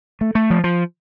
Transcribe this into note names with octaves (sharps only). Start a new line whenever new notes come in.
A3
A3
F3
F3